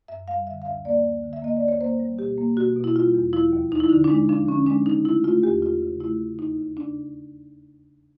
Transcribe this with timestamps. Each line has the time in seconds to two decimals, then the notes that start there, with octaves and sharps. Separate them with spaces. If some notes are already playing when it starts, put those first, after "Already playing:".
0.08 F#2 E5
0.28 G3 F5
0.47 D3 E5
0.62 F5
0.66 D2 E5
0.85 A#3 D5
1.04 D2
1.23 D3
1.33 E5
1.42 A#3 D#5
1.56 D5
1.62 D2
1.68 C#5
1.81 A#3 C5
2.00 G3
2.19 B2 G4
2.38 A#3
2.57 B2 F#4
2.76 B2
2.84 E4
2.95 G3 F4
3.14 E2
3.33 F3 E4
3.53 D#2
3.71 F3 D#4
3.80 E4
3.89 D3 D#4
4.04 D4
4.10 G#3 D#4
4.29 F3 D4
4.48 D3 C#4
4.67 G#3 D4
4.86 C#3 D#4
5.05 A3 E4
5.24 A3 F4
5.43 E2 G4
5.62 E2 F4
5.82 C#3
6.00 A3 E4
6.20 C#3
6.39 D#2 D#4
6.58 C#3
6.77 C#3 D4